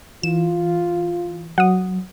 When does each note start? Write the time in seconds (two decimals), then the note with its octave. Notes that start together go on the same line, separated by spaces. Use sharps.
0.23 E3 F4 E7
1.58 F#3 F#5 D#6